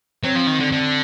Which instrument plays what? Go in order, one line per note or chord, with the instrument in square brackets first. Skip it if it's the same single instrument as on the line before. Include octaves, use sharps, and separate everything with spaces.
[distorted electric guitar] F#3 [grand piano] C4
[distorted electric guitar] F3
D#3
D3
D3